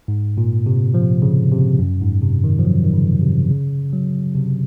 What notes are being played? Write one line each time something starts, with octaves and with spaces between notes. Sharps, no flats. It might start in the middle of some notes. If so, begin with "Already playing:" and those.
G#2
A#2
C3
F3
C#3
C3
F#2
G#2
C3
D#3
F3
F#3
D#3
C#3
C3
C#3
F#3
C3